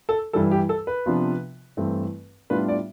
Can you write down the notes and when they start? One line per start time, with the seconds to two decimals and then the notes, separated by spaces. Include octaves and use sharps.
0.09 A4
0.33 G2 E3 G3 A4
0.51 G4
0.69 A4
0.87 B4
1.06 C3 F3 B3 D4 F4
1.77 G2 E3 A3 C4
2.50 A2 G3 B3 D4 F4 B4
2.68 D5